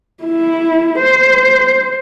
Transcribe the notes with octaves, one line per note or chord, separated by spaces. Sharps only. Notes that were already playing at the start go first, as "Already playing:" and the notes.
E4
C5